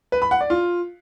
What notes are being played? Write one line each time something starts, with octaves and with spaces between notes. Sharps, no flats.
B4
B5
F#5
D5
F4